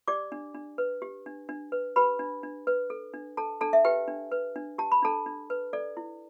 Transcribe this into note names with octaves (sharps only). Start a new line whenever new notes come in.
G4 D5 D6
D4
D4
B4
G4
D4
D4
B4
G4 B4 B5
D4
D4
B4
A4
D4
A4 A5
D4 A4 A5
E5
G4 B4 G5
D4
B4
D4
G4 A5
B5
D4 A4 A5
D4
B4
A4 D5
E4